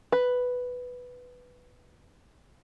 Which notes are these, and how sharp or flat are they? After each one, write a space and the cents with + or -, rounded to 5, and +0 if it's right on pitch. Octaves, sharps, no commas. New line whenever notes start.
B4 +5